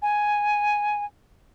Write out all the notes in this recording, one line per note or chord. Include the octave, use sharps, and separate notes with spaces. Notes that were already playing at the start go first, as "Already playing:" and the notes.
G#5